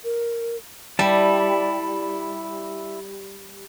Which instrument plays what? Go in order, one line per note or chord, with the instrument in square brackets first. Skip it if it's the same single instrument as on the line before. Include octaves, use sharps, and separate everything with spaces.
[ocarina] A#4
[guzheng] G3 [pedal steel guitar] E4 D5 A5